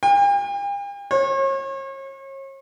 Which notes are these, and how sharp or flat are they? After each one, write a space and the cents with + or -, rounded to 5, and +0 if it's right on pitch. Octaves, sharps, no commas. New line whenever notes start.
G5 +45
C#5 -40